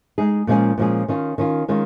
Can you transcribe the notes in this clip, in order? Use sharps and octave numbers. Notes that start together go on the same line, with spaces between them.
G#3 D#4 G#4
A#2 F3 G#3 C#4 G#4
A#2 F3 G#3 C#4 G#4
D#3 C#4 F4
D#3 C#4 F4
D#3 G#3 C#4 F4